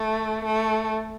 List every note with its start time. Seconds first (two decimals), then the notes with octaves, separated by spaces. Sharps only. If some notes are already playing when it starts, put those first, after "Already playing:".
Already playing: A3
0.46 A3